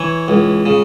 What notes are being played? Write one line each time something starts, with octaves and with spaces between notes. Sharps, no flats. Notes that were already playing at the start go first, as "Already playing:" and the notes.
Already playing: E3 C#5
C#2
C#3